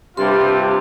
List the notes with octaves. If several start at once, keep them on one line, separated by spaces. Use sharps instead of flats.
G2 C3 F4 G4 C6